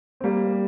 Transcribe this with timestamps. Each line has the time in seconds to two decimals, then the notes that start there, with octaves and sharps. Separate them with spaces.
0.20 C4
0.24 G3 A#3